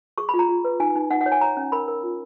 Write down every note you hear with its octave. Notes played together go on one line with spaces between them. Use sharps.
G#4 C#6
F4 B5
A#5
F4
B4
D#4 G#5
D#4
D#4 F#5
F#5
C#5
G#5
C#5 A#5
C#4
A#4 B5
A#4
F4